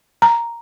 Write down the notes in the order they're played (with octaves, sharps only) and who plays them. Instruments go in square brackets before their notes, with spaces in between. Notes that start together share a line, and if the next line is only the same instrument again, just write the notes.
[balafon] A#5